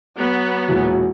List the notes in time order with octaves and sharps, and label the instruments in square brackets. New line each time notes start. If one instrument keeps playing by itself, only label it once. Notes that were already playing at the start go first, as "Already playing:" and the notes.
[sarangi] F#3 [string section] B3
[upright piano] E1 A#2 E3 [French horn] F#4